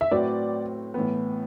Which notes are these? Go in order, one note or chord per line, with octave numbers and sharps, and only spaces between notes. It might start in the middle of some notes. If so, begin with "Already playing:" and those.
E5
A2 F#3 C4 F#4 B4 D5
A2 E3 B3